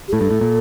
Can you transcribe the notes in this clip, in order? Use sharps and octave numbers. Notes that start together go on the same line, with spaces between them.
G4
A2 A4
G2
A2
A#2